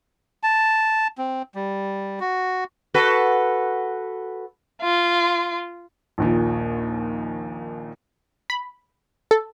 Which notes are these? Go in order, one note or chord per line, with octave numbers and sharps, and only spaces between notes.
A5
C4
G3
F#4
F#4 A4 B4
F4
A#1 D#2 A#2
B5
A4